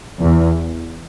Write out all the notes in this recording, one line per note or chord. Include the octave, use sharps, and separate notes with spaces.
E2